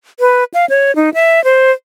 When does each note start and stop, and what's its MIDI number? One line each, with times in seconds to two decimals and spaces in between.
0.20 0.44 71
0.54 0.65 77
0.70 0.95 73
0.96 1.10 63
1.14 1.43 76
1.44 1.71 72